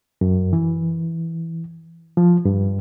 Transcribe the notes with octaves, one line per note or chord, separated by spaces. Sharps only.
F#2
E3
F3
G2